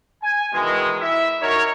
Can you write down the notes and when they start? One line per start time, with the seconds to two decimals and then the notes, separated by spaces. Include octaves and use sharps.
0.23 G#5
0.53 B2 D#3 E3 G#3
1.01 E4 E5
1.41 D#4 F#4 A#4 C#5